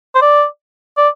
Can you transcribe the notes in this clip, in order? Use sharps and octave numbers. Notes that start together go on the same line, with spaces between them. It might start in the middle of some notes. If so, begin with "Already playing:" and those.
C5
D5
D5